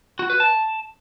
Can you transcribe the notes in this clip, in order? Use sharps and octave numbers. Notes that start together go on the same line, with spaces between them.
F#4
B4
A5